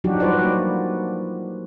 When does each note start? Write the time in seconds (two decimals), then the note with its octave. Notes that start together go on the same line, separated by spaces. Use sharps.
0.04 F3 F#3 D4 D#4 F#4 G4
0.20 G3 F#4 B4 C5 D5
0.43 A#3